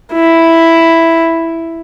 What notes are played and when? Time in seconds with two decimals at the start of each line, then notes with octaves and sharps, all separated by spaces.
0.12 E4